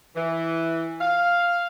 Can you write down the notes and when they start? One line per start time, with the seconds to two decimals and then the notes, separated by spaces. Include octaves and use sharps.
0.15 E3
1.01 F5